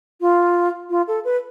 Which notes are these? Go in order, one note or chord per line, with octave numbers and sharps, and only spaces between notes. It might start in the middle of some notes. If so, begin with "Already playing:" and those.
F4
F4
A4
B4